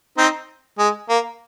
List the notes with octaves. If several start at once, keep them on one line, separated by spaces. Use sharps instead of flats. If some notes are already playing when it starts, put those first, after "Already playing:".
C4 D#4
G#3
A#3